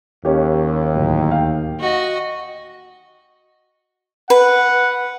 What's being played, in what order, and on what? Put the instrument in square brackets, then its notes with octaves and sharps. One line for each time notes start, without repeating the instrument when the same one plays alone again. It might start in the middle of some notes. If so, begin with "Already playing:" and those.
[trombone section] D#2 [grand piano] C#4 G4
[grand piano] D1
F5 G5
[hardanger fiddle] F#4 D#5
[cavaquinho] B4 [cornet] F#5